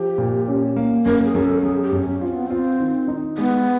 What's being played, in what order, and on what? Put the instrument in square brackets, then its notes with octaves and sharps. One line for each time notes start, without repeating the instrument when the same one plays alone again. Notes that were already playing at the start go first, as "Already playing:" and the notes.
Already playing: [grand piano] F3 [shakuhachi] G4
[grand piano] A#2
C#4
A#3
[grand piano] F#2 [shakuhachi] A#4
[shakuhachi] G#4
[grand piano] F#2 [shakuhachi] A#4
[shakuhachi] A4
[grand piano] F#2 [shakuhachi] G#4
[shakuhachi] G4
[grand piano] F#2
[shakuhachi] C#4
[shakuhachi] C4 [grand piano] F4
[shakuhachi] B3
[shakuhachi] C4 [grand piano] F4
[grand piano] D#3
D#4
[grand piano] G#3 [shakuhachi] B3